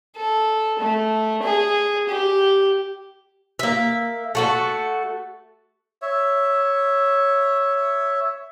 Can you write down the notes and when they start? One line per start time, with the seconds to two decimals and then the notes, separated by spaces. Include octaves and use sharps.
0.17 A4
0.79 A3
1.43 G#4
2.09 G4
3.59 A#3 E5
4.35 A3 F#4 A4
6.02 C#5 E5